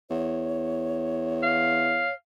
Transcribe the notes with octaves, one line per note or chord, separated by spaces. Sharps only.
E2 C#5
F5